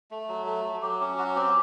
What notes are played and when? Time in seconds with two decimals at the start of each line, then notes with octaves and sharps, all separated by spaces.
0.11 A3
0.29 F#3
0.46 A3
0.65 F#3
0.82 F#3 G4
1.00 C#4 G4
1.17 F#3 F#4
1.35 C4 G4